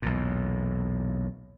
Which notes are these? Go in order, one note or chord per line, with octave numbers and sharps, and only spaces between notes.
B1 E2 A#2